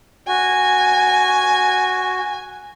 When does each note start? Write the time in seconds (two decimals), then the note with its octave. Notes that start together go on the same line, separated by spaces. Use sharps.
0.28 F#4 G#5